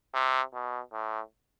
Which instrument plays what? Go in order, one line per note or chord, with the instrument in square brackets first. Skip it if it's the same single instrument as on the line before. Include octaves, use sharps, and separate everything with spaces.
[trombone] C3
B2
A2